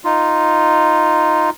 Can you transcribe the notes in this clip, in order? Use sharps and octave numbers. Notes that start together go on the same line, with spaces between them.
D#4 F4